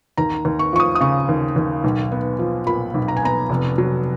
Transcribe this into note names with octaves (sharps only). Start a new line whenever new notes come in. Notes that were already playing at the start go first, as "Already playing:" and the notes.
D#2 A#5
D#2
C#6
F3 C#6
D#6
D#6
C#3 C#6
D#2
D#2
B1
B3
F3
A#2 B5
B1
A#5
G#5
B3 A#5
F1
F#3